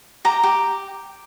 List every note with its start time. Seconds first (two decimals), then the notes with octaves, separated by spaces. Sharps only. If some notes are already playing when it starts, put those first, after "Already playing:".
0.25 G4 A#5
0.43 G4